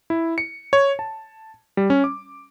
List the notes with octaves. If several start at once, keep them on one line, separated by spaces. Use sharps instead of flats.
E4
C#7
C#5
A5
G3
C#4
D6